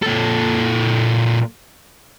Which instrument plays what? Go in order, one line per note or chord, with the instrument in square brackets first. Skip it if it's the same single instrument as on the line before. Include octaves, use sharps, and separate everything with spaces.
[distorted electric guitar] A#2 A4